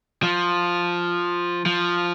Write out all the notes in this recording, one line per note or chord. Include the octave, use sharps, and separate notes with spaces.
F3
F3